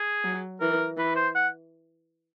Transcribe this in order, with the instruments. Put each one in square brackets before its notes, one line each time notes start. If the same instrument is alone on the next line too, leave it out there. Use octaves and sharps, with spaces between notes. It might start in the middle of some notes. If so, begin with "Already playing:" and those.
Already playing: [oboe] G#4
[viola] F#3
[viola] E3 [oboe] A#4
[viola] E3 [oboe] B4
[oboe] C5
F#5